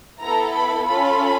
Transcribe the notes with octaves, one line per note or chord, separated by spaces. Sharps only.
B3 E4 A4 A#5
B5
C#4 F4 A4 B5